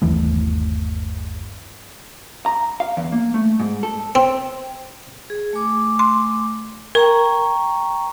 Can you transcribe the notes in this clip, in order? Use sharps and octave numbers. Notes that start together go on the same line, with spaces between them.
G1 D#2 E3 A3
A#5
F5
E2
A#3
A3
G#2
A4
C4
G#4
A3 G#5 D6
C6
A#4 G5 A#5 C#6